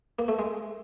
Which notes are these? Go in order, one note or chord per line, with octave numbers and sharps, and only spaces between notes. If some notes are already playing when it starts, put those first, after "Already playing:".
A#3
A3
G#3